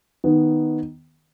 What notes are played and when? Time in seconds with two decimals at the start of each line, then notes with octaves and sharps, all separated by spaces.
0.24 D#3 B3 D#4